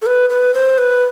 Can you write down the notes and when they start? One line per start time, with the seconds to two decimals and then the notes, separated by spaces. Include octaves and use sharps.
0.02 A4
0.06 B4
0.30 B4
0.54 C5
0.78 B4